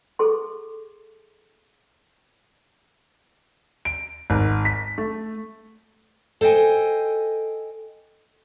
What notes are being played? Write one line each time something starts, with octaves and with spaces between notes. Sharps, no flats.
G#4 A4 C6
D7
G#1
B6
A3
A4 C5 D#5 E5 G5 G#5